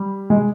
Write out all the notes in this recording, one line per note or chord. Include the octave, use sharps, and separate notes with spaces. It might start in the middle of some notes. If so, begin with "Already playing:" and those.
Already playing: G3
G#3